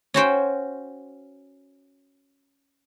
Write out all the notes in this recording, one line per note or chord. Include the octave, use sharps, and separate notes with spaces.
C#4 F#4 C5 G5